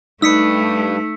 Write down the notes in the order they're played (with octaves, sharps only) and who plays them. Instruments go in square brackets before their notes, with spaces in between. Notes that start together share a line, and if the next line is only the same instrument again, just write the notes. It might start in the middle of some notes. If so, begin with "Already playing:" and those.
[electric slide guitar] G2 B4 [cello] A3 [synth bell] D#4 [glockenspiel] E6 B6 C#7